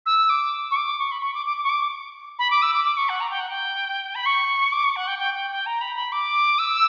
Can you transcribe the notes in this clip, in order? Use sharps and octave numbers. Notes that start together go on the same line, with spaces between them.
E6
D6
C#6
D6
C#6
B5
C#6
D6
D6
D6
C#6
D6
B5
D6
E6
D6
D6
C#6
F#5
A#5
G5
F#5
G5
B5
C#6
D6
C#6
F#5
G5
G5
G5
G5
A#5
B5
B5
D6
E6